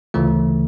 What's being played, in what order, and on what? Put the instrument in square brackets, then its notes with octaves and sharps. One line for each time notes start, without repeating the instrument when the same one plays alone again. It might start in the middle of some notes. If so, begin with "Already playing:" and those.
[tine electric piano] D2 C#3 E3 A3 F4